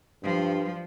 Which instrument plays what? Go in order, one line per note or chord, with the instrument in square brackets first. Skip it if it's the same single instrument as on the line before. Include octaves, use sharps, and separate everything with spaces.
[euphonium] G2 [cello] F3